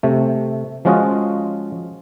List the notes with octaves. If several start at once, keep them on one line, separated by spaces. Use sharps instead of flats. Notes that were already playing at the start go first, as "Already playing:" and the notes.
C3 A3
F3 G#3 C#4 F4 F#4 D#5